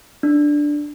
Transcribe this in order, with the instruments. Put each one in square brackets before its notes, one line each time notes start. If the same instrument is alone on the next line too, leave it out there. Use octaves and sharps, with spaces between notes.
[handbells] D4